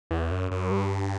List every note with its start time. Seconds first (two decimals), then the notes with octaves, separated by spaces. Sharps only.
0.11 E2
0.31 F#2
0.51 F#2
0.71 G2